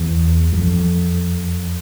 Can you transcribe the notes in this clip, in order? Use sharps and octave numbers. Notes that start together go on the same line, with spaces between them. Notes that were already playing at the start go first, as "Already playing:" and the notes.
Already playing: E2
F#2
F2